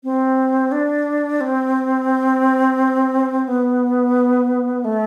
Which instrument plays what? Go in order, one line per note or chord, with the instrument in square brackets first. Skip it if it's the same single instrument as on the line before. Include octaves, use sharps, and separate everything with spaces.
[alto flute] C4
D4
C4
B3
A3